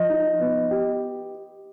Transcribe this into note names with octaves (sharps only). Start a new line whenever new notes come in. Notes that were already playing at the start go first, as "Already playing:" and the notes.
Already playing: F3 D#5
D#4
B3
G4